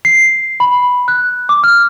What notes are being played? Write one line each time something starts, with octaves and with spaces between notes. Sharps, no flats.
C7
B5
F#6
D6
F6